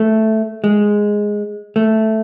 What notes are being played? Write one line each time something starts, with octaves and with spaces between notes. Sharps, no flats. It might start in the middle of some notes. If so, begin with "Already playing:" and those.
Already playing: A3
G#3
A3